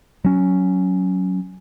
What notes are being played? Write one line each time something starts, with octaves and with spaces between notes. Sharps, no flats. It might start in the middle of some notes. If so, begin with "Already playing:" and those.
F#3 C#4